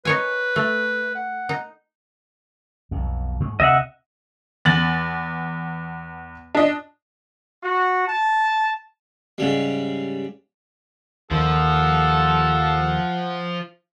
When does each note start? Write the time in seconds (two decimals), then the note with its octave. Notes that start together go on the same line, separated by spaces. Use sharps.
0.05 D#4 B4 C#5 G#5
0.56 A3
1.15 F#5
1.49 D#4
2.91 B1 F2
3.40 G#2 G#3 A3
3.60 D2 C3 D#5 E5 F#5
4.65 E2 A6 F#7
6.55 D4 D#5
7.62 F#4
8.07 A5
9.38 G#2 C#3 G3
11.31 D#2 F3 A4 F#5